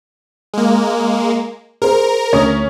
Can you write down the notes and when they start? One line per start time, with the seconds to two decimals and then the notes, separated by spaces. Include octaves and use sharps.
0.53 G#3 A#3
1.82 G#4 A#4 C5
2.33 D2 C#4 D#6